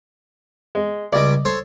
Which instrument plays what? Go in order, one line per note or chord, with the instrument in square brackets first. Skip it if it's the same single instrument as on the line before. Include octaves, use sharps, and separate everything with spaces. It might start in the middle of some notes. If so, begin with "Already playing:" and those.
[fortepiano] G#3
[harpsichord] C#2 G3 D6 [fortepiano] D5 D#5
[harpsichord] A4 C5 C#5